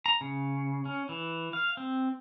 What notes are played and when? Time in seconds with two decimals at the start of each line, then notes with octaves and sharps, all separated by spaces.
0.06 A#5
0.21 C#3
0.85 C#4
1.09 E3
1.53 F5
1.77 C4